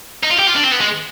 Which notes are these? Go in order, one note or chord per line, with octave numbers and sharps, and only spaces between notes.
D#4
F4
G4
F4
D4
C4
B3
G#3